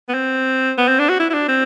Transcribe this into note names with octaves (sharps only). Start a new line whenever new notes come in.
B3
C4
B3
C4
D4
F#4
E4
E4
D4
C4